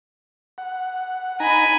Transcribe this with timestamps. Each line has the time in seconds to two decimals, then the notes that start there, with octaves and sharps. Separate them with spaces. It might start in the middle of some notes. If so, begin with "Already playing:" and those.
0.58 F#5
1.40 D#4 G#5 A#5 B5